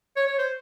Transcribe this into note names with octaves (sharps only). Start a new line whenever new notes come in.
C#5
C#5
C5